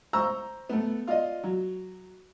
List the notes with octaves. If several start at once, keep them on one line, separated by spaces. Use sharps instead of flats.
C5 A#5 C#6 E6
A3 B3
F4 D5 D#5
F#3